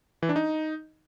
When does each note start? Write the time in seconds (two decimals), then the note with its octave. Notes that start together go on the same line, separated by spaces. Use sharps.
0.22 E3
0.29 D4
0.36 D#4